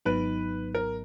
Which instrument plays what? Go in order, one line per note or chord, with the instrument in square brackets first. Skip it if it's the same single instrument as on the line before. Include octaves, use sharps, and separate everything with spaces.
[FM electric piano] G#1 G#2 F#3 B3 D#4 [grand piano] B4
[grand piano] A#4